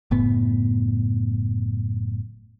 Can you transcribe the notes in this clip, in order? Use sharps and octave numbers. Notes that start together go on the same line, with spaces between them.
F#1 A2 B3